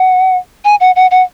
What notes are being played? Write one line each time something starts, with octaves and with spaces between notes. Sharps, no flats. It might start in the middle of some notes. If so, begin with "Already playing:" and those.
Already playing: F#5
G#5
F#5
F#5
F#5